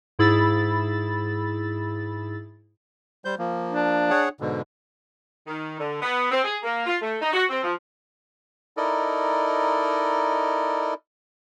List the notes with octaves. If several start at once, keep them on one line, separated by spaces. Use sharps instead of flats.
G#2 E4 G#4 B5 E6 A6
G3 C5 G6
F3 A#3
D4
G#4 C#5 F#5
G#2 B2 D3
D#3
D3
B3
C4
G#4
A#3
F4
A3
D#4
F#4
C4
F3
D#4 E4 A4 A#4 D5 D#5